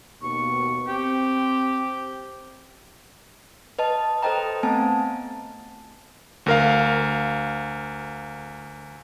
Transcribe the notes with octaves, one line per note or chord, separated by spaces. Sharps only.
D#2 B2 C#6
C4 G4
B4 D#5 A5
A4 B4 C5 D#5 G5 A#5
A3 B3 C4 G#5 A5
D2 A#4 F5